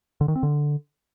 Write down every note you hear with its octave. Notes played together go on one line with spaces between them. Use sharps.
D3
D#3
C4
D3